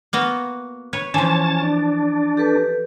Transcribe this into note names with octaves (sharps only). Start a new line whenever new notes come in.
A#3 B3 F#4
B4 C#5
E3 F3 C#4 A5
D4
G4 A4 B4